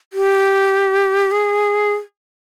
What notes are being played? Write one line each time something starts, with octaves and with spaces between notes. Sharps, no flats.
G4
G#4